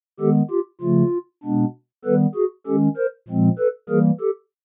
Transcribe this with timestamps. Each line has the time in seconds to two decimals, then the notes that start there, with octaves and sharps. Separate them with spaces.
0.20 D#3 G#3 B3 G4 A4
0.51 F4 G4
0.81 C#3 F3 A3 F4
1.44 B2 G#3 B3 D4
2.05 D#3 G3 B3 A4 B4
2.35 F#4 G#4
2.67 D#3 G#3 C#4 G4 A4
2.97 A#4 C5
3.28 A#2 F3 G#3 C4
3.58 A4 B4
3.89 E3 G3 A#3 G#4 A#4
4.21 G4 A4